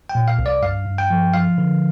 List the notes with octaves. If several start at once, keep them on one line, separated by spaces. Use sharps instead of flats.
G5
A#2
F5
C2
D5
G2 F5
G2
G5
F3
F3 F5
D3